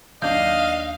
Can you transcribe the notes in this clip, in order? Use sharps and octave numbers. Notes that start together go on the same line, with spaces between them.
D#2 F#3 D4 D#5 F5 G6